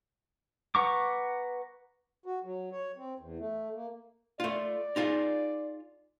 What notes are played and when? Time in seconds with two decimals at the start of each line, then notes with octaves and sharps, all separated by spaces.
0.75 B4 F#5 A#5 C#6 D6
2.26 F#4
2.44 F#3
2.72 C#5
2.97 C4
3.19 E2
3.39 A3
3.74 A#3
4.40 A3 F4 D5
4.96 D#4 F4 G#4